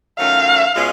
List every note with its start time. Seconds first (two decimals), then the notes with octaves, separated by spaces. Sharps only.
0.18 D#3 F#3 A3 C#4 F4 F5
0.75 B2 G#3 C#4 F4